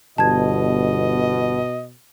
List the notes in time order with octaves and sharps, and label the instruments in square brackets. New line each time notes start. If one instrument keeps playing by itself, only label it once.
[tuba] G1 [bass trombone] B2 [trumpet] D#5 [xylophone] A5 G#6